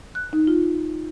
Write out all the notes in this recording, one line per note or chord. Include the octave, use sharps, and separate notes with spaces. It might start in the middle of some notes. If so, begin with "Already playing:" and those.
F#6
D#4
F4